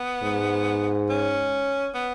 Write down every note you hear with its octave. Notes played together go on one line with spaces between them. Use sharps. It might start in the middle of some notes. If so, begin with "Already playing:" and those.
Already playing: B3
G#2
C#4
B3